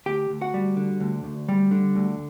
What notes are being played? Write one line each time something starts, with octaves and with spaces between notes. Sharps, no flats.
D2 G4 G5
D2
F#4 F#5
G3
D3
D2
D2
G3
D3
D2